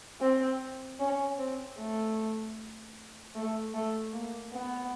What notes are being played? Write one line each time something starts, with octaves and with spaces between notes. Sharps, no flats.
C4
C#4
C4
A3
A3
A3
A#3
B3